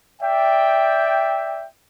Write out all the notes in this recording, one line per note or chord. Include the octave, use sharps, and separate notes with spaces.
D5 E5 G5